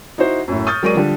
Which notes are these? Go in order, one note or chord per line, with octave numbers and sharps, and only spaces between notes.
D#4 E4 F#4 C5
F#2 A2
C#6 D#6 F6 G6 A6
F#3 G#3 A#4 D5 C#6 D#7
D3 F3 G3 D4